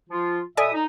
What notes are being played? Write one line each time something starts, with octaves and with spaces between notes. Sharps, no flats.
F3 F4
B2 A4 D5 E5 G#5 D#6
D#4